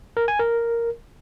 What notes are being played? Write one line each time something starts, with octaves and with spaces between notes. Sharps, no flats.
A#4
G#5
A#4